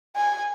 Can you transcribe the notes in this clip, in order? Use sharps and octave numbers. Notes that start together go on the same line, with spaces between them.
G#5